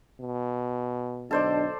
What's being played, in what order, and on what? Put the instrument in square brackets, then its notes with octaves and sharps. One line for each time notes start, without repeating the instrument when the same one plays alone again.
[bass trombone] B2
[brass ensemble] B1 D3 D#5 [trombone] D4 [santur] A4 C5 D5